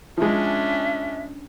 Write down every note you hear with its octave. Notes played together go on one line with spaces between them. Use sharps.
F3 G#3 C#4 D4 E5